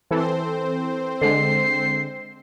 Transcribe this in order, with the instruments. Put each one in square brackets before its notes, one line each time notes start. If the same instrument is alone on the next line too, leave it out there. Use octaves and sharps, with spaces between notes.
[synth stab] E3 A4 [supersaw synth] C4 C5
[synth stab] D3 G#3 [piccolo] C7